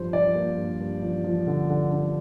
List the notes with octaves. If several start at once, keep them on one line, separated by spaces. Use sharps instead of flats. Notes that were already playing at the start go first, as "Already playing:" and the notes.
Already playing: G2 F3 C5
F3 D5
A#3
G2
G2
F3
F3
D3
D3
D3